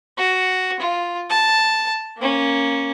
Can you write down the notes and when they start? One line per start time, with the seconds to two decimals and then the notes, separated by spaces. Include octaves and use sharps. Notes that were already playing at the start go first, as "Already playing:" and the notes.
0.17 F#4
0.80 F4
1.30 A5
2.18 A#3 C#4